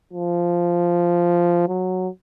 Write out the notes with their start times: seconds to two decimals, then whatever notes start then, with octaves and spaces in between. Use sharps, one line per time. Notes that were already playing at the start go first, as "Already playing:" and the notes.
0.13 F3
1.68 F#3